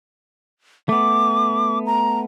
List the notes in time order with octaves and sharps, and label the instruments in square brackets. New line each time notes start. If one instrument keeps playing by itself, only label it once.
[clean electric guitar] A3 B3 [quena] D6
[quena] A#5